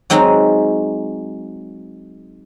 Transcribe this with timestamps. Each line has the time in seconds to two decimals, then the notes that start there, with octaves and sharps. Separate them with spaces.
0.10 F#3 G#3 C4 D#4